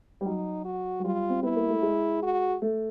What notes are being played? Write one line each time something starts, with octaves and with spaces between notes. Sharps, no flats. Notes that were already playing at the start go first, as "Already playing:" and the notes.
G3
F#3 D#4
F#4
F#3
G3 F4
C4
B3 E4
A#3
A3
G#3
F#4
A3